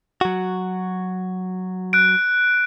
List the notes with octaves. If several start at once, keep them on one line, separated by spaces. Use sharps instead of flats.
F#3 F#4
F#6 D7